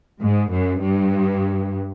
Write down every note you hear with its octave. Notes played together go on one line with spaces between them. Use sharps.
G#2
F#2
G2